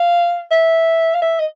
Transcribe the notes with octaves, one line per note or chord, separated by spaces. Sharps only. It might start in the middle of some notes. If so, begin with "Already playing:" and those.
Already playing: F5
E5
F5
E5
D#5